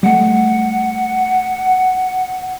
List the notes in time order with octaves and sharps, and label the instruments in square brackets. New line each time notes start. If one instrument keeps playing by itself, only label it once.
[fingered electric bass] G3 A3 [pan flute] F#5